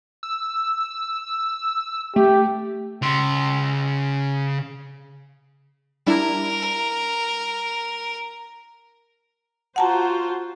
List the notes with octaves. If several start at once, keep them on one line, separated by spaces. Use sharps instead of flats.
E6
A3 G4
C#3 C6
G3 D4 E4 A#4
F4 F#4 C5 F#5 A5 A#5